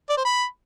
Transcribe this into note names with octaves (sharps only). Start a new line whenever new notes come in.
D5
C5
B5